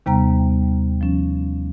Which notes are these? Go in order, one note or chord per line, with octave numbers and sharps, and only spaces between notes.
D#2 C3 G3 B3 G5 A#5
F3 C#4